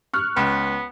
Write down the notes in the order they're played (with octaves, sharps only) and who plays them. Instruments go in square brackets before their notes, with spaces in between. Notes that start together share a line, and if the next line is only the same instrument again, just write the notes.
[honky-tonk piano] C#6 F6 F#6
[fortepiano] C#2 [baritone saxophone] B3